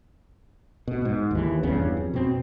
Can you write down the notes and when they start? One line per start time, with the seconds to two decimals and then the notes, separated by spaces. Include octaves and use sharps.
0.88 B2
1.05 G#2
1.31 D#2 E3
1.63 E2 G2 C#3 B3
1.97 F2
2.14 B2 C4